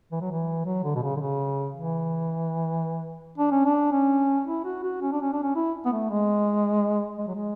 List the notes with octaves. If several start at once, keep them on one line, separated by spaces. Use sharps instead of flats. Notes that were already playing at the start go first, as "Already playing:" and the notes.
E3
F#3
E3
F#3
D3
B2
C#3
D3
C#3
E3
D4
C#4
D4
C#4
E4
F#4
F#4
C#4
D4
C#4
D4
C#4
E4
B3
A3
G#3
G#3
F#3
G#3